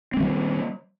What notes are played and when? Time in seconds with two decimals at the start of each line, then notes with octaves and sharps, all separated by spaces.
0.14 C4
0.17 G#3
0.20 D#3
0.23 G3